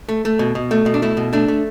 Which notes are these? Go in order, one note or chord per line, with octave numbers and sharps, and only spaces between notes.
A3
A3
B2
B2
A3
B2
D4
A3 E4
B2
A3 D4
A3